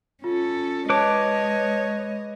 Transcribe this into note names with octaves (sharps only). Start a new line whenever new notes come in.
C#4 F4 A4
G#3 B4 C#5 D#5 A5 D6